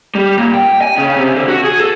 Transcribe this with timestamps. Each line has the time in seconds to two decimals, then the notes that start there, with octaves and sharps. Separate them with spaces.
0.15 G3
0.37 A#2
0.54 G5
0.81 G#5
0.98 C#3
1.17 C3
1.35 D3
1.48 F#4
1.64 G#4
1.80 A4